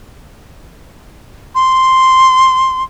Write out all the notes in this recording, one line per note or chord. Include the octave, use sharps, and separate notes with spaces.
C6